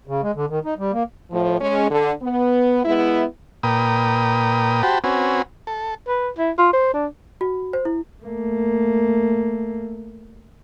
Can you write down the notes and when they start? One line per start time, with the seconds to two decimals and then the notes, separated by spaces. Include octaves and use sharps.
0.07 C#3
0.23 G#3
0.35 D3
0.50 D#3
0.65 D#4
0.79 G3
0.93 A#3
1.31 A2 F3
1.60 G#3 C#4
1.90 D3
2.22 B3
2.85 G#3 B3 E4
3.63 A#2 A#4 B4 G5 D#6
4.83 F#4 G4 C5 G5 A5 B5
5.04 C4 C#4 F#4 B4 G#5
5.67 A4
6.08 B4
6.38 E4
6.58 F4
6.73 C5
6.94 D4
7.41 F#4
7.73 C5
7.85 E4
8.24 A3 A#3